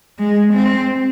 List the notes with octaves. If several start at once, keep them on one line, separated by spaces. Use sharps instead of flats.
G#3
C4